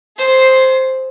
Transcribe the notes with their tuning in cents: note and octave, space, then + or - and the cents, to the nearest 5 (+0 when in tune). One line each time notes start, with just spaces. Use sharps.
G#4 +25 C5 +0